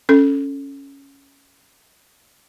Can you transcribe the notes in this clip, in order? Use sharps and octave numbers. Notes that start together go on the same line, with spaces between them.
C#4 A4